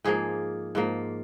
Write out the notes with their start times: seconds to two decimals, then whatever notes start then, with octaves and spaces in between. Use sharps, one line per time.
0.04 G#2 F3 A#3 G#4
0.75 G#2 F3 A#3